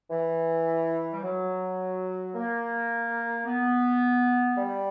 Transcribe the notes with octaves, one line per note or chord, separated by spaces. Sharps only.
E3
G3
F#3
A#3
B3
G3